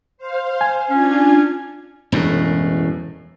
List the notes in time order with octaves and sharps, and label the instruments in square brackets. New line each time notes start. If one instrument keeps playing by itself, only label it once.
[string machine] C5 F5
[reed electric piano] G#5
[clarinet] C#4 [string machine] D4 F4 G#6
[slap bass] E1 F#2 A2